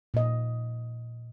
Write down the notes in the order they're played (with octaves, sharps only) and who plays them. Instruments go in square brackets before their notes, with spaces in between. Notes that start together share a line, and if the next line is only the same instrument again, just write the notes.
[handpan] A#2 D#5